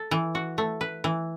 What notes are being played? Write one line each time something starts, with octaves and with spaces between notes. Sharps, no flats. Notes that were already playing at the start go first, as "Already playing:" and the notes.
Already playing: A4
E3
F#4
A3
B4
E3